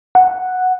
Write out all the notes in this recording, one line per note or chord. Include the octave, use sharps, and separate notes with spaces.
F#5